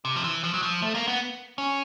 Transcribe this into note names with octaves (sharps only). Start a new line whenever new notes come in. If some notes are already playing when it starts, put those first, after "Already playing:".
C3
F3
E3
F3
F#3
F3
A3
A#3
B3
C#4